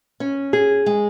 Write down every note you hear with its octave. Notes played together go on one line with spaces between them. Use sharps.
C#4
G#4
G#3